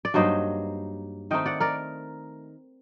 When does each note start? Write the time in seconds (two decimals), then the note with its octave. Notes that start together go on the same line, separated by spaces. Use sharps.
0.05 D5
0.14 G2 F#3 A#3 D#4 C5 D#5
1.31 D#3 A3 C4 D#4 D#5 G5
1.46 D5 F#5
1.60 A#4 D5